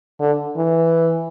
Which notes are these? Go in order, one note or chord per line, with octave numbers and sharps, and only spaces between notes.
D3
E3